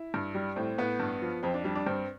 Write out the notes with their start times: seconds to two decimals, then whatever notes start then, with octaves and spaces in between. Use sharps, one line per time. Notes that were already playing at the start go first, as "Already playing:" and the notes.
Already playing: E4
0.14 G2
0.35 G3
0.56 A2 C4
0.78 A2 B3
1.00 G2
1.22 F3
1.43 F2 C4
1.54 D4
1.64 G3 D4
1.75 D4
1.86 G2 C4